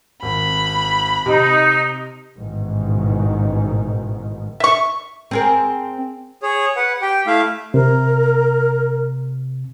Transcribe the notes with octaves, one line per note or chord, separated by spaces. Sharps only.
G#1 B5
C3 D#4
A1 G#2 B2 D#3
E5 C#6
C4 G#4 A#4
G#4 C#5
B4 F#5
G4 G5
A3 E4 E5 F5
C3 A#4